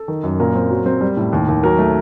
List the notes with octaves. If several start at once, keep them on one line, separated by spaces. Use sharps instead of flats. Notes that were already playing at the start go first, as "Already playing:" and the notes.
Already playing: A4
D#3
F#2
A#2 A#4
C4
F#3
C4
G3
A2
D#2
D#2
F#3 A#4
A3